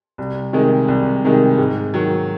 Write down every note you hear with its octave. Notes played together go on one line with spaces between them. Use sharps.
C2
C3 D#3 G#3
C2
C3 D#3 G#3
G#2
D#3 F#3